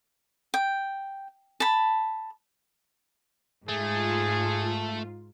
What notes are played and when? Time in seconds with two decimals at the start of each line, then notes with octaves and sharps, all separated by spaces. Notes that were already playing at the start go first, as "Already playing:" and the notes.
0.54 G5
1.60 A5 B5
3.69 G#2 A3 F4 G#4